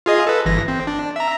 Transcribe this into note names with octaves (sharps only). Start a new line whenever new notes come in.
F4 G#4 D#5
A4 B4
G1 E3 A#6
C4
D4
E5 A#5